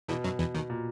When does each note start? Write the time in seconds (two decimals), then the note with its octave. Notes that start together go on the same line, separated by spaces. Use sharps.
0.09 E2 B2 E3
0.24 F#2 F#3
0.39 E2 E3
0.54 D#2 D#3
0.70 A#2